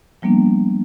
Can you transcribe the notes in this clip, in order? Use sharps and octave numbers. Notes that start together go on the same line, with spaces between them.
F3 G3 A#3 B3 D4